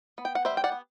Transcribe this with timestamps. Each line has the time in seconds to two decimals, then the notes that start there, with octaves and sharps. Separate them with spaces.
0.18 B3
0.25 G5
0.35 F#5
0.45 G3 C5 E5
0.57 G5
0.64 D5 F#5
0.72 B3